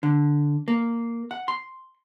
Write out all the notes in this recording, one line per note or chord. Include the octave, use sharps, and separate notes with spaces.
D3
A#3
F#5
C6